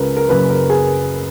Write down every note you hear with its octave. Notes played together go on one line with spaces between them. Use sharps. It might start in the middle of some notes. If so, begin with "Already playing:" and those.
Already playing: C#2 C#3 A#4 B4
A#4
F#1 F#2 C#3 B4
A#4
G#4